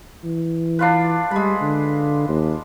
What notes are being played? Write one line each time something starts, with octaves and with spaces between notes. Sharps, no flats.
E3
D4 F4 B4
G3 G#3 B5
D3
D#2